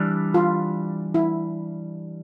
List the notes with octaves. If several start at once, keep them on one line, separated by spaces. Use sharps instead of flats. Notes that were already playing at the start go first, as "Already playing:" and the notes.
Already playing: E3 G3 D4
F4
E4